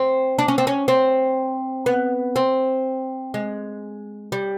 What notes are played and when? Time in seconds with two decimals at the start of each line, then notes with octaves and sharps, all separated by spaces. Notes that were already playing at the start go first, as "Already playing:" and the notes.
Already playing: C4
0.39 D4
0.48 C#4
0.58 C4
0.67 C#4
0.88 C4
1.86 B3
2.36 C4
3.34 G#3
4.32 G3